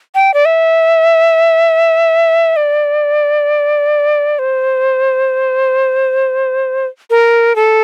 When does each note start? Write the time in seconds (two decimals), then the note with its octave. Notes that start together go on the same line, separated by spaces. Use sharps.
0.15 G5
0.34 D5
0.45 E5
2.56 D5
4.39 C5
7.10 A#4
7.56 A4